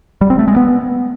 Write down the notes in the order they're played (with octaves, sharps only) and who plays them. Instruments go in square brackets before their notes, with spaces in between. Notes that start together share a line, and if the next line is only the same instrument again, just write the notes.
[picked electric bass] G3
C4
A3
G#3
B3